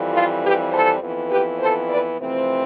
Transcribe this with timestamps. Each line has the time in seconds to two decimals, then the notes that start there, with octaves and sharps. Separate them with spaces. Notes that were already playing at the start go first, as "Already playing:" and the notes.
Already playing: F2 E3 G3 C4
0.12 F4 A4
0.42 G4 B4
0.71 A4 C5
1.01 F2 E3 B3
1.30 G4 B4
1.60 A4 C5
1.89 B4 D5
2.18 F2 C3 E3 A3 C4